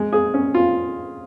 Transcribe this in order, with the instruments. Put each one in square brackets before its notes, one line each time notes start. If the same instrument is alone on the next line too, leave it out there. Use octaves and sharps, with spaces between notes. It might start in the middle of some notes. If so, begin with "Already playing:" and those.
Already playing: [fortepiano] G#3
G#4
C#4
F4